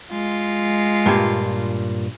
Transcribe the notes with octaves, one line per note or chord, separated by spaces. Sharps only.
G#3 F4
G2 A#2